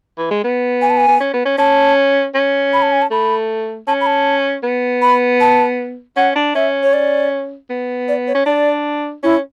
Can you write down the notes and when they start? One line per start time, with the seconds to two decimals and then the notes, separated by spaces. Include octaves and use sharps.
0.18 E3
0.31 G#3
0.44 B3
0.82 G#5
0.90 A5
0.97 G#5
1.08 B3
1.20 C#4
1.34 B3
1.46 C#4
1.58 C#4 A5
2.35 C#4
2.73 B5
2.82 A5
2.92 G#5
3.02 A5
3.11 A3 B5
3.87 C#4 A5
4.01 B5
4.06 A5
4.64 B3
5.02 B5
5.40 A5
6.17 C#4 F#5
6.36 D4
6.55 C#4 E5
6.83 C#5
6.93 D5
7.70 B3
8.08 D5
8.27 C#5
8.35 C#4
8.46 D4 D5
9.23 C#4 E4